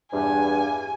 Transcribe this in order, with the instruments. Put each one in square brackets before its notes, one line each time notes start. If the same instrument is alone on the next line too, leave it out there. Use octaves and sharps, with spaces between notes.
[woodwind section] E2 G2 [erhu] G#5